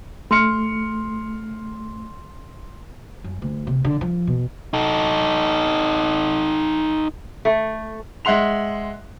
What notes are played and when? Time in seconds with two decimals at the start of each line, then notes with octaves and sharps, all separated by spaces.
0.31 A3 C6 F6 C#7
3.24 F#2
3.42 D2
3.67 C3
3.85 D3
4.01 F3
4.27 B2
4.74 D#4 A4
7.45 A3
8.25 G#3 E5 F#5 C6 F7